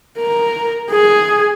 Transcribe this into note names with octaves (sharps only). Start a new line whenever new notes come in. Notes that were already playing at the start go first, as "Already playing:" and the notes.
A#4
G#4